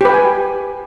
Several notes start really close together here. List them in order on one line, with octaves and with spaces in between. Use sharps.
G4 B4 G5 G#5